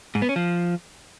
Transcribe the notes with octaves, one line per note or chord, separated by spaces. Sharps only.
G#2
B3
C#4
F3